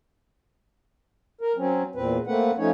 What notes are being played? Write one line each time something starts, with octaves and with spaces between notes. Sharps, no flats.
A#4
F#3 C4 C#4
E2 A#2 C4 B4
A3 A#3 C4 B4 F#5
F3 A3 C#4 D#4 C#5